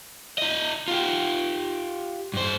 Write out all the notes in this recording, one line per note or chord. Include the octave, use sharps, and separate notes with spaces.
E4 D#5
F4 G4
G2 C5